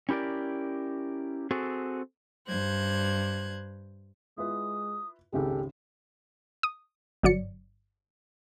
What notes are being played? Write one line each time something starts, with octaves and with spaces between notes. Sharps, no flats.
C#4 E4 G4 A#4 D5
C4 F#4 G#4 A4
G2 C5 F#6 G#6
G#3 E4 F4 B4 D#6
G#1 C#2 C#3 G#3 G4 A4
D#6
G1 F#3 D5 C#7